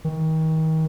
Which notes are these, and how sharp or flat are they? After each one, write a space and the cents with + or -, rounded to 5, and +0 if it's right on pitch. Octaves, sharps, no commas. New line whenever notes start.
D#3 +35